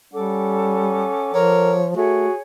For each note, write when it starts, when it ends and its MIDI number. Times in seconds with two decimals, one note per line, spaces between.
0.13 1.11 55
0.13 1.30 61
0.13 1.78 69
0.13 1.78 78
0.13 1.78 86
1.34 1.91 53
1.34 1.73 70
1.34 1.88 73
1.96 2.27 57
1.96 2.32 66
1.96 2.41 68
1.96 2.41 73